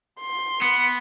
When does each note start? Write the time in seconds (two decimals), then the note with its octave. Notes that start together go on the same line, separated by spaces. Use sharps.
0.20 C6
0.62 B3 C#7